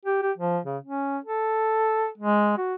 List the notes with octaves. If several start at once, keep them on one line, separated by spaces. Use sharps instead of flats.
G4
G4
F3
C#3
C#4
A4
G#3
F#4